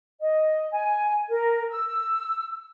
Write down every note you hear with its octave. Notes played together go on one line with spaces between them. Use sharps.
D#5
G#5
A#4
E6